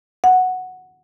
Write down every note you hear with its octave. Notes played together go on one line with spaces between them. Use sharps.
F#5